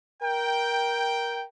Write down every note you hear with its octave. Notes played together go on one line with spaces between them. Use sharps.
A#4 G5